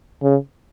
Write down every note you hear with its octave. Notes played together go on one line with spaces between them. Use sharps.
C#3